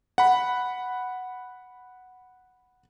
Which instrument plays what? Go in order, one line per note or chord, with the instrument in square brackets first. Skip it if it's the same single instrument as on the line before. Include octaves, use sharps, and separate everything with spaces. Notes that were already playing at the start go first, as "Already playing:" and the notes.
[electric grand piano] F#5 B5